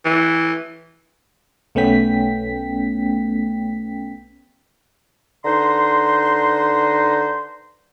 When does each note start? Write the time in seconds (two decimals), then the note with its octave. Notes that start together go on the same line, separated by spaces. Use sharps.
0.05 E3
1.75 B1 A3 B3 C#4 G5 B6
5.45 D3 D#4 B4 C5 A#5 C6